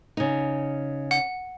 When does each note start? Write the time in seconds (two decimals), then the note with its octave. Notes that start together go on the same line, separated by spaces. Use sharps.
0.17 C#3 D#4
1.11 F#5